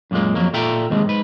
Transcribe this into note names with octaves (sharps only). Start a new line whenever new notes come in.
F#2 A#2 D3 G#3 A#3
F2 F#3 A#3
A#2 F4 A4 E5 G5 A#5
D#2 G#2 C3 G#3
G#2 B4